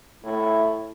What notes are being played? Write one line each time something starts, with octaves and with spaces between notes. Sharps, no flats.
A2 E4